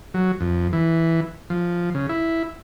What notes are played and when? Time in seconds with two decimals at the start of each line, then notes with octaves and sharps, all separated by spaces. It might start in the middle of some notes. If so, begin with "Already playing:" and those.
0.14 F#3
0.40 F2
0.73 E3
1.50 F3
1.95 C#3
2.09 E4